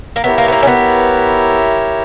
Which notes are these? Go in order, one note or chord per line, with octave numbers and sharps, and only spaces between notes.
A#3
B3 E4 G4 A#4 C#5 E5
A#3
B3
A#3
C#4
B3